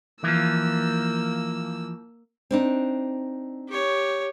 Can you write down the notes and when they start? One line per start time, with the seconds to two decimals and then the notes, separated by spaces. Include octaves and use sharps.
0.24 E3 F3 A#3 E6
2.51 C4 D4 D#4
3.69 G4 C#5